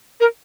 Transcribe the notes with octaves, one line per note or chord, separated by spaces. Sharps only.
A#4